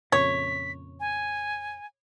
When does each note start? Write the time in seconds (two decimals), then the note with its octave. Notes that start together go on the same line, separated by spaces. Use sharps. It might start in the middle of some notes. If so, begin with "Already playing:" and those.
0.12 F2 A#2 C#3 C#5 B6
1.00 G#5